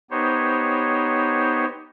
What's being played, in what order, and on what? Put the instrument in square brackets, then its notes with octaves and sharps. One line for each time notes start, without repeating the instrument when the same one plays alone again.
[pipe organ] B3 D#4 G4 C5 C#5